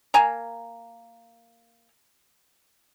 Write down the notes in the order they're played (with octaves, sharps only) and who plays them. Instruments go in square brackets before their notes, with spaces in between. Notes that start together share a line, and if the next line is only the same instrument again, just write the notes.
[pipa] A#3 G#5 A#5